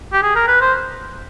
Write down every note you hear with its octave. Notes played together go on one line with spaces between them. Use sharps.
G4
G#4
A#4
B4
C5